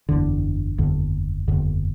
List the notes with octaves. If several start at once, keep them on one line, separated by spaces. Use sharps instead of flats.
F#1 E2 D3
F#1 E2 D3
F#1 E2 D3